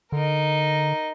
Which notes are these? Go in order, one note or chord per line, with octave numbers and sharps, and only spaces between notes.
D3 D#4 A#4